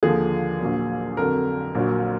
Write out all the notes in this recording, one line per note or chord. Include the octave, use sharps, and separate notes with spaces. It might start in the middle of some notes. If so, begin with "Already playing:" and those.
D#2 D3 F3 G#4
A#1 A#2 F#3
F2 D3 F#3 A#4
A#1 A#2 F#3